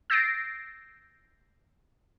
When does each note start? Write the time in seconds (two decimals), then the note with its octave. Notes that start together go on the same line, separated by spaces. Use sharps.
0.10 E6 G6 A6 A#6 C7 D7